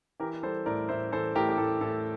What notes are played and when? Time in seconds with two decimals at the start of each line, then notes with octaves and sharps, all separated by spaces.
0.20 E3 G4 A#4
0.43 G3 A4 C5
0.66 A2 A#4 D5
0.89 A2 C5 E5
1.12 E3 A4 C5
1.35 A2 G4 A#4
1.49 G4
1.58 A2 A4
1.81 A2 A4